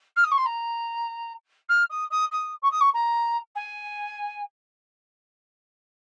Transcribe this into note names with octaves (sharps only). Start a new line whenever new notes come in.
F6
D#6
C#6
C6
A#5
F6
D#6
D#6
D#6
C#6
D#6
C#6
A#5
G#5